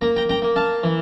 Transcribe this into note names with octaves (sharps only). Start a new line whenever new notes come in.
A#3 A#5
G5 A#5
G5 A#5
A#3
F5 A5
E3